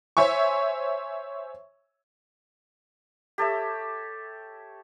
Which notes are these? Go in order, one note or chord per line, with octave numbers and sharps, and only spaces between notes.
C5 C#5 E5 G#5 C#6
G4 A4 C#5 E5